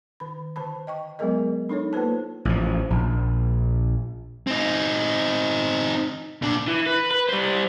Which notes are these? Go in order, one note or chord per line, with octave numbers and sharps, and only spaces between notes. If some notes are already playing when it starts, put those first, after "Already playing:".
D#3 B5
D3 C5 A5 B5
D#5 G5 C#6
F#3 G#3 B3 G#4 A#4 D#5
D4 D#4 A4 C#5
A#3 F4 B4 C5 A5
A1 F3
A#1
C4 D#4
A#2 D4
E3
B4
B4
G3 C5